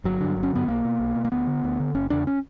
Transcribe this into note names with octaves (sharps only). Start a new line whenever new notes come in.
G1 F#3
G2 D3
G1
C#4
G2 D3 B3
B1 A#3
B2
B1
B2
A#3
D2 B3
D3
D2
D3
F#1 C#4
E2 C#3 D4
C#4